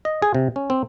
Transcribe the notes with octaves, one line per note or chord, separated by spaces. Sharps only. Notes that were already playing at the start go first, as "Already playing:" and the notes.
D#5
G#4
C3
C#4
C4